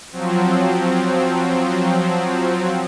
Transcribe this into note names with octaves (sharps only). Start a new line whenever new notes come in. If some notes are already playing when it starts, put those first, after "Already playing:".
F3 F#3 C4